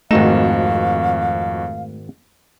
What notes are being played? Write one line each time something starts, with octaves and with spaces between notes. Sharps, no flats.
G#1 F2 A3 D#4 F#4 F5 E7